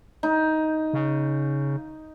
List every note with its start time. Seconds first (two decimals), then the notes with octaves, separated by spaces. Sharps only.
0.23 D#4
0.93 C#3